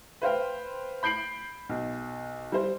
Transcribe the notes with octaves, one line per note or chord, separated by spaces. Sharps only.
B4 C5 F5 G5
B5 G6 C7 D7 F#7
B1
G3 C5